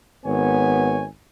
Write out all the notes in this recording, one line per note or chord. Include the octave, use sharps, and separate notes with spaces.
G#1 B3 C#5 G#5